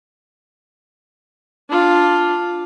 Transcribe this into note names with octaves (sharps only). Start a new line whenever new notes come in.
D4 F4